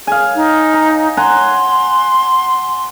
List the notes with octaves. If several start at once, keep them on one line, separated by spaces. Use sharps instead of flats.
G#4 F5 G#5
D#4
A#5
F#5 G#5 A#5 C6